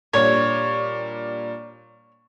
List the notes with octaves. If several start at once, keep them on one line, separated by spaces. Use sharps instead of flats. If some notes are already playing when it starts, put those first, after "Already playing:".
A#2 G3 D4 C#5